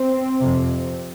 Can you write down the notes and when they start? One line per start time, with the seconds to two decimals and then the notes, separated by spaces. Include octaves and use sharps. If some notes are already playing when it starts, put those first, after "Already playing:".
Already playing: C4
0.40 F2 C3